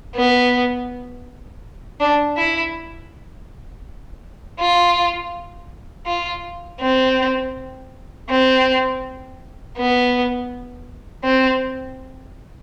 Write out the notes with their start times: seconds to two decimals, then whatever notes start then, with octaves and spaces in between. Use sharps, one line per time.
0.16 B3
2.00 D4
2.37 E4
4.59 F4
6.06 F4
6.81 C4
8.29 C4
9.77 B3
11.24 C4